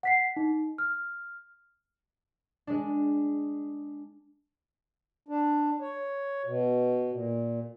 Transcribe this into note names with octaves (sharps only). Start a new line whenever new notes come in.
F#5 B6 C7
D#4
F6
G#3 D4
D4
C#5
B2
A#2